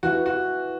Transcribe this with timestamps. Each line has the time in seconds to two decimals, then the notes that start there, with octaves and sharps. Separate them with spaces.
0.03 E3 F#4
0.26 F#4